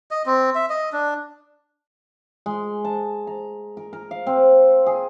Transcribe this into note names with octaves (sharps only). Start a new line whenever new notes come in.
D#5
C4
E5
D#5
D4
G#3
A5
A#5
A#4
A#4
F5
C4
G#4